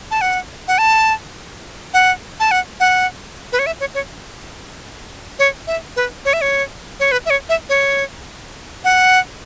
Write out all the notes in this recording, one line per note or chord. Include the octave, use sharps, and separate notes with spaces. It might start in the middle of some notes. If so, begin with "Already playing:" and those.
A5
F#5
F#5
A5
F#5
A5
F#5
F#5
B4
C#5
E5
C#5
C#5
C#5
E5
B4
C#5
E5
C#5
C#5
B4
E5
C#5
E5
C#5
F#5